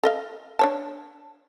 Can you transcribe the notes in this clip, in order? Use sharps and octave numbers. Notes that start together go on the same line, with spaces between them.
A4 D#5 F5
D4 C#5 A5